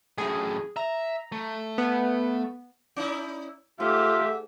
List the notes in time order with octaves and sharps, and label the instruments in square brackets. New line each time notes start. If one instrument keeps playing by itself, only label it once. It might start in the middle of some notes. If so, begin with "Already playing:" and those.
[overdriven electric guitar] F#2 A2 [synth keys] G#4
[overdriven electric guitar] E5 [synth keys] A#5
[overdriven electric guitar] A3
[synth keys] B3
[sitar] C#4 D#4 E4
[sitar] G#2 [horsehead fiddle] A3 G4 [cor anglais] F4 [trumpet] E5